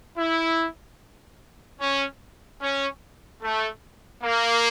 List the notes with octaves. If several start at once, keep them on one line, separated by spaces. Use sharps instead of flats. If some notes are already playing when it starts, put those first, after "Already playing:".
E4
C#4
C#4
A3
A#3